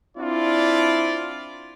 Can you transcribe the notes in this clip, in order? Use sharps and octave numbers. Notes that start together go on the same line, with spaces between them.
C4 D4 E4 F4 D5